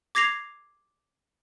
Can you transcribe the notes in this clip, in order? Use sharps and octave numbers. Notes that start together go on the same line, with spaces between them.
D6 G#6 A#6 C7 F7